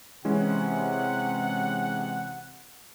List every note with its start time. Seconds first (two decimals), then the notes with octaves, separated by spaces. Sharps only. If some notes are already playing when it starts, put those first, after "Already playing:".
0.25 C3 E3 G#3 C#4 F#5